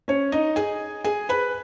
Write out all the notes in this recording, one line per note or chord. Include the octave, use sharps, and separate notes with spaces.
C#4 C#5
D#4 D#5
G#4 G#5
G#4 G#5
B4 B5